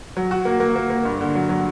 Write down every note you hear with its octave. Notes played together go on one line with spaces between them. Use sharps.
F#3
F#4
A#3
A#3
A#3
A#3
G2
D3
F#3
F#3